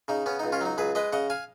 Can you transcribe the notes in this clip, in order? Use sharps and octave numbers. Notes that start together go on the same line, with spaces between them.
C#3 D#4
B3 C#4
C#2 D#4
C#4 F4
F#3 D#4
C#2 G#4 B4
G#3 B4 D#5
C#3 D#5 F#5
F5 G#5